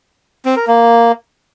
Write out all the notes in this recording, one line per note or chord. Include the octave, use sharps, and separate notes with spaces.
C4
A#4
A#3